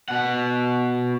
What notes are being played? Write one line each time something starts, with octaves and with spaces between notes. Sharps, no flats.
B2 F#5